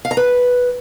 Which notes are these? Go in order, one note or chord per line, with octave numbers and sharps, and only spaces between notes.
F5
A#5
B4